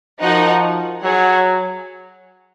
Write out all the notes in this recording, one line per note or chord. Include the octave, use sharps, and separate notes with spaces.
F3 D#4 F#4 A#4 D#5 F#5
F#3 G#4 C#5 F#5